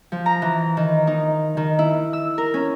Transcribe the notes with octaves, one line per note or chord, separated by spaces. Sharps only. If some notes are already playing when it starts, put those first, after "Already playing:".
F3
A#5
E3
D#3
D#4
D#3
E4
E6
A#4
C#4